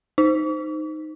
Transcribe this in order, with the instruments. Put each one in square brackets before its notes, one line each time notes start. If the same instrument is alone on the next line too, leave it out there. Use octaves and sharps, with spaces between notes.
[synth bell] D#4